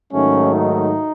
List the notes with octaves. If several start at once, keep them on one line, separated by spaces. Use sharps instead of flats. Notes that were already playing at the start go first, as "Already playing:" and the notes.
G#2 D#3 F#3 A3 C#4
D#4